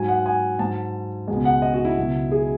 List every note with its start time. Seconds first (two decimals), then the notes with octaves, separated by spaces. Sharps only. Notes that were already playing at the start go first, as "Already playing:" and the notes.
Already playing: G#2 F#3 G#5
0.08 F#5
0.26 G#5
0.59 G#2 F#3 A5
1.28 C#2 B2 G#3
1.45 F#5
1.62 D#5
1.74 F#4
1.85 E4
1.97 C#2 B2 F#3
2.32 G#4